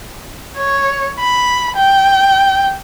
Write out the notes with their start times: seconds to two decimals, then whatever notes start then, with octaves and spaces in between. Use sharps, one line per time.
0.57 C#5
1.20 B5
1.76 G5